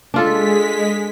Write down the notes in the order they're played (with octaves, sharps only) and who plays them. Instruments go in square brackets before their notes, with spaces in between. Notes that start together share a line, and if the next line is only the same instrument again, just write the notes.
[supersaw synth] G#3 B6 [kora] D4 F4 A4